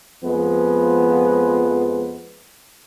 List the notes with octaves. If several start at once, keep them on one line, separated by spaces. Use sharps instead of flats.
F2 F3 G#3 B3